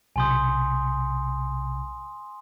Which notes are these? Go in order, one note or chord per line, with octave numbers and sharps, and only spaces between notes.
B1 C3 G#5 C6 D#6 G6